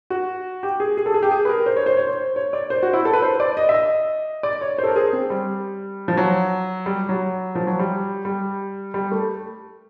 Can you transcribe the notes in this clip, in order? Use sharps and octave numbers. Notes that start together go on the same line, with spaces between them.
F#4
G4
G#4
G#4
A4
G#4
G4
G#4
B4
A#4
C5
C#5
C5
C#5
C5
C#5
D5
C5
F#4
E4
A4
B4
C5
D5
D#5
E5
D#5
D5
C#5
C5
A4
A#4
G#4
C4
G3
F3
F#3
G3
F#3
F3
F#3
G3
G3
G3
A3